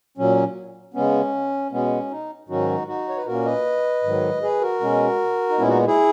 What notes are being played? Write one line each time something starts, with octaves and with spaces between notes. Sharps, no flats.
A#2 F#3 C#4
C#3 G#3 B3 C#4
B2 G#3 B3 C#4
D#4
G#2 D#3 F#3 C#4 D#4 F#4
D#4 F#4
C#5
B4
A#2 A#3 C#4 F#4 A#4
B4 D#5
G#2 D#3 F#3
G#4 B4
F#4 A#4
B2 G#3 C#4
D#4
A#2 G#3 B3 C#4 E4
D#4 F#4
E4 G#4